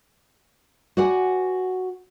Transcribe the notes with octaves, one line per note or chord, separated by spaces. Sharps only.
F#4 B4 D5 F#5 G#5